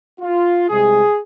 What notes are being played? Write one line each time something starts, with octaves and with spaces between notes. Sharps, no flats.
F4
C2 C3 G#3 G#4